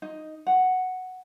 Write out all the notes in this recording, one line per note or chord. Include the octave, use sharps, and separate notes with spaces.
D#4
F#5